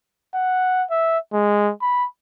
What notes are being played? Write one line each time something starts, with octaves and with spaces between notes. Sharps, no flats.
F#5
E5
G#3
B5